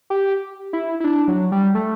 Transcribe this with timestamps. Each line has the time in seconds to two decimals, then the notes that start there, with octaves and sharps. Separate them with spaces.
0.10 G4
0.73 E4
1.00 E4
1.04 D4
1.28 F#3
1.52 G3
1.75 A3